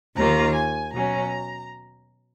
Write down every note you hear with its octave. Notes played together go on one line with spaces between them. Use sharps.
D#2 D#3 A#3 F4 A#5
G#5
B2 F#3 C#4 A#5